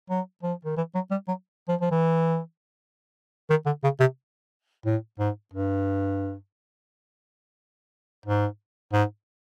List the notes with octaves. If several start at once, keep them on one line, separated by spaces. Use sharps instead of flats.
F#3
F3
D#3
E3
F#3
G3
F#3
F3
F3
E3
D#3
D3
C#3
C3
A2
G#2
G2
G#2
G#2